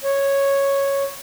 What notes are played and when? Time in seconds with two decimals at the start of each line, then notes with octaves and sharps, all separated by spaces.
0.04 C#5